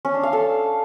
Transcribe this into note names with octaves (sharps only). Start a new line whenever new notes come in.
C#4
D4
F5
A4